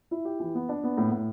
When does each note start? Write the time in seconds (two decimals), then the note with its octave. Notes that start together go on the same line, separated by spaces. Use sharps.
0.11 E4
0.25 G4
0.40 E3
0.55 B3
0.69 D4
0.83 B3
0.97 A2
1.11 A2